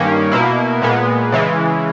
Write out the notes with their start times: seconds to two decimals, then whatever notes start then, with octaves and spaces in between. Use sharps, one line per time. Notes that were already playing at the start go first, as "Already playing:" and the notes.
Already playing: G2 D#3 A#3 C#4
0.32 B2 A#3 E4
0.82 A#2 G#3 B3
1.32 C#3 E3 G#3